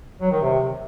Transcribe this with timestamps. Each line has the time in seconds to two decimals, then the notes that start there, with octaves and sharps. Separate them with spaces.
0.20 F#3
0.31 D#3
0.41 C3